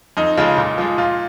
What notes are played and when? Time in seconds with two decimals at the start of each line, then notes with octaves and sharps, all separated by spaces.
0.17 F2 D#4
0.37 C#3 F3 G#3
0.57 A#2
0.78 F3 G#3
0.98 A#2 F4